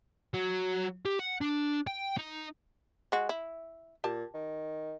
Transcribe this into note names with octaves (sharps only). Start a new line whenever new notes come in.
F#3
G4
F#5
D4
G5
D#4
G#3 F#4
E4
A#2 G4 A5
D#3